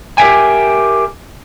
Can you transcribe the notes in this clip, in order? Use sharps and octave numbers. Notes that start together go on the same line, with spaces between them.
G4 A#4 C5 E5 G5 G#5